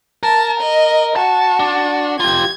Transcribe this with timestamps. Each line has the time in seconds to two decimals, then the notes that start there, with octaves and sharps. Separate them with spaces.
0.23 A#4 A5
0.61 D#5
1.16 F#4 A5
1.60 D4
2.20 F4 G4 G#6